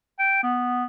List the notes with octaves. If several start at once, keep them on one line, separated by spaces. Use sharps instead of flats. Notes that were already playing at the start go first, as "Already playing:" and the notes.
G5
B3